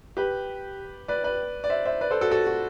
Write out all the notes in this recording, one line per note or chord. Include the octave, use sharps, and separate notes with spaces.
G4 B4
B4 D5
B4 D5
D5
C5 E5
C5 E5
B4 D5
A4 C5
F#4 A4
F#4 A4
F#4